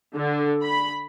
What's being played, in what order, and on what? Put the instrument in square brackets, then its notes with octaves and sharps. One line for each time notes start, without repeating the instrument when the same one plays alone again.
[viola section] D3
B5